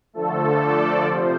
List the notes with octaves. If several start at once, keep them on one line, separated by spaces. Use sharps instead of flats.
D3 F3 A3 A4
D5
C3 F3 C5